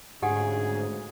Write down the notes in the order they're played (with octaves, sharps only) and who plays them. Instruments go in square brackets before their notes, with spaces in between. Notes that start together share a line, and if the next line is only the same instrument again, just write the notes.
[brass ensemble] D2 C#3 [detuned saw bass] G#2 [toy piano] G4 F#5 G#5 [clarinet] G#4